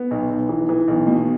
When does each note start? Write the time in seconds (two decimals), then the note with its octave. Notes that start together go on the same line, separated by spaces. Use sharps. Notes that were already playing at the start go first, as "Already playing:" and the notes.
Already playing: B3
0.11 B1
0.31 B1
0.49 E3
0.69 E3
0.88 B1
1.07 B2